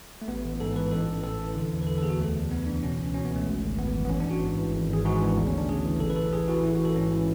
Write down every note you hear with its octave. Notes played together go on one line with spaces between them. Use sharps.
A3
A1 B3
A1
G#2 A4
E3 B4
A1 A4
A1
A2 A4
E3
D3
E2
B4
D3 A4
A4
E2 G#4
F#4
D2 A3
D2
C#3 B3
E3 D4
B2 C#4
C#2
B2 C#4
B3
C#2
A3
G#1
G#1
F#2 B3
E3
B3
A1 C#4
D4
A1 F#4
G#2
E3
G#1
G#1 G#4
G#2 F#4
E3 D4
D2 B3
C#4
D2 D4
C#3 G#4
E3
A1 A4
B4
A1 A4
A2 G#4
E3 F#4
A1 E4
F#4
A1 A4
G#2 C#4
E3